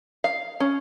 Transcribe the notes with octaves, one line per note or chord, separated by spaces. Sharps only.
F5
C#4